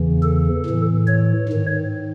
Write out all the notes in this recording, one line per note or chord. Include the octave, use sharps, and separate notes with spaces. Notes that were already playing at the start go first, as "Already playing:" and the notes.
Already playing: E2 C#3 E3
A4
A2 E3
C#5
G#2 D#3